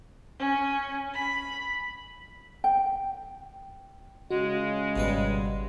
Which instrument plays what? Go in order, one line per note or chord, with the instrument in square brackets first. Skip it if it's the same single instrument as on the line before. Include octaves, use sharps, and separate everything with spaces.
[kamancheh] C#4
B5
[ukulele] G5
[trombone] C#3 [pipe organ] G#3 [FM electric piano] F#4
[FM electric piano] G#1 [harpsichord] B2 G3 B4